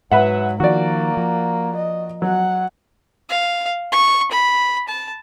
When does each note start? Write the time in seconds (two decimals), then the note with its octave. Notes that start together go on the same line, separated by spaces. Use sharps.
0.12 G#2 F#3 B4 E5 F#5
0.60 D#3 F3 A#3 F#4 D5
1.17 F3
1.76 D#5
2.22 F#3 F#5
3.29 F5
3.92 C#6
4.31 B5
4.88 A5